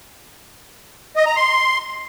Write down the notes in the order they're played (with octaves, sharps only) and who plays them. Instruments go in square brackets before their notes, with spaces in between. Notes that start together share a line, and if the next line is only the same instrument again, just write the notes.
[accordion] D#5
A#5
C6